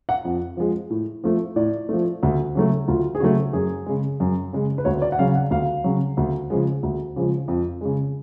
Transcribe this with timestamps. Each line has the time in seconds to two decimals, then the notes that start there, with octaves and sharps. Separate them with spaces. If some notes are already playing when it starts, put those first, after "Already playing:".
0.09 F#5
0.25 F2
0.57 F3 G#3
0.90 A2
1.24 F3 A3
1.56 A2 D5
1.89 F3 A3
2.23 D2
2.55 C#3 F#3 A3
2.88 D2 F4
3.15 G#4
3.20 C#3 F#3 A3 F#4
3.53 F#2 G#4
3.86 C#3 G#3
4.20 F#2
4.53 C#3 G#3
4.78 B4
4.85 D2 C#5
5.02 D5
5.12 F#5
5.19 C#3 F#3 F5
5.35 F#5
5.51 D2 F5
5.84 C#3 F#3
6.17 D2
6.50 C#3 F3 G#3
6.83 D2
7.16 C#3 F3 G#3
7.48 F2
7.81 C#3 G#3